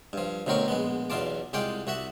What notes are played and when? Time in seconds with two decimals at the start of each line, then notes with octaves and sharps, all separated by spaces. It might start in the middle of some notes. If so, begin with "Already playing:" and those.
0.13 G2 F3
0.47 D2 B2 F#3 C4 A#4 C#6
0.68 A#1 G#3 B3
1.10 B1 E2 B2 F4 A5 D6
1.53 C2 G#3 F4 F#5 G5 D6
1.87 C2 F#4 E5 F#5